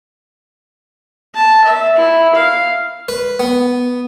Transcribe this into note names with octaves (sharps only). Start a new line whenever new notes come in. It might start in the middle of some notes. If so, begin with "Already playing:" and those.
A5
E5
E4
F5
B4
B3